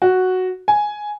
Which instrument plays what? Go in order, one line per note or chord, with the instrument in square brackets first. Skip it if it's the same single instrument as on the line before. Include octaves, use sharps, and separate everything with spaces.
[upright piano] F#4
G#5